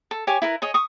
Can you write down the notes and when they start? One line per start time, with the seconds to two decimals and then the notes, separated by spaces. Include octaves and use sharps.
0.11 A4
0.27 G4 C#5 G#5 D6
0.42 E4 A#4 B4
0.62 G#4 C#5 D#5
0.74 C#6 D#6